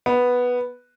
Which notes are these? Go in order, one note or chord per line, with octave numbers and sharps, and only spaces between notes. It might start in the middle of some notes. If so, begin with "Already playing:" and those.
B3